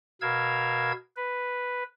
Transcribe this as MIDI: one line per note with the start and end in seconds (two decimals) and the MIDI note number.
0.21 0.92 47
0.21 0.92 70
0.21 0.92 77
0.21 0.92 88
0.21 0.92 92
1.16 1.83 71